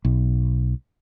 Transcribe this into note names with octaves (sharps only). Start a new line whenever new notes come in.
B1